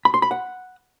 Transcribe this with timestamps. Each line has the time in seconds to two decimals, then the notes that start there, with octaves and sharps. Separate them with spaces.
0.05 B5
0.14 C6
0.22 B5
0.31 F#5